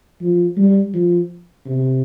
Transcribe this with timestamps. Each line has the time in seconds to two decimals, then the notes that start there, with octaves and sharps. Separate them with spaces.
0.21 F3
0.57 G3
0.94 F3
1.66 C3